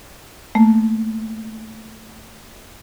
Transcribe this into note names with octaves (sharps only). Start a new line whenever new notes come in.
A3 A#3